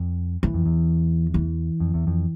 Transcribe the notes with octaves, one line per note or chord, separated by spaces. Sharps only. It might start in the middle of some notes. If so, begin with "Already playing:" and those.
Already playing: F2
E3
F2
E2
E3
F2
E2
F2